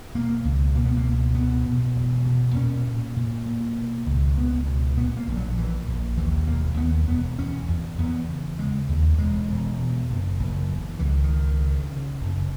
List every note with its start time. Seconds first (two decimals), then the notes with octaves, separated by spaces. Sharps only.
0.15 B2 A#3
0.44 C#2
0.75 B2 A#3
0.86 B3
0.97 A#3
1.05 C#2
1.35 B2 B3
1.66 B2
1.96 E1
2.26 B2
2.56 A#2 C#4
2.86 A#2
3.16 A#2
3.46 A#2
3.76 B2
4.06 C#2
4.37 C#2 B3
4.67 B2
4.97 A#2 B3
5.17 A#3
5.27 A#1
5.37 F#3
5.57 A#2 E3
5.88 A#1
6.17 D#2 E3
6.47 E1 A#3
6.77 D#2 B3
7.08 E1 B3
7.38 E2 C#4
7.68 E2
7.98 E2 B3
8.28 C#3
8.58 C#3 G#3
8.89 D#2
9.18 E1 G#3
9.50 E1
9.79 B2
10.10 F#1
10.39 F#1
10.69 E2
10.99 C#2 E3
11.08 D#3
11.24 D#3
11.30 C#3
11.60 C#3
11.89 C#3
12.20 F#1